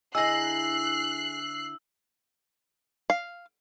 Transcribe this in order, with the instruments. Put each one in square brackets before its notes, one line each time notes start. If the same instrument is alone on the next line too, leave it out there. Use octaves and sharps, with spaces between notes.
[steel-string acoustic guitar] D3 E4 D#5 [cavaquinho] G#4 A#5 [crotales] E6 [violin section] F#6 C7
[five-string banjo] F5